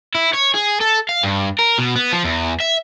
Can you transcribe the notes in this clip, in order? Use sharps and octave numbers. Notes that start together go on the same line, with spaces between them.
E4
C#5
G#4
A4
F5
G2
A#4
B2
B3
F3
E2
E5